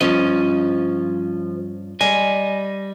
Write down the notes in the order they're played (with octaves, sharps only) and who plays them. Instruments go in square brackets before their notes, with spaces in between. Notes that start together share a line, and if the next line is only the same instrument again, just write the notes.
[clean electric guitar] G2 C#4 D#5 [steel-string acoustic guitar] F3
[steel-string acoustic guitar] G3 [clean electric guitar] D#5 G#5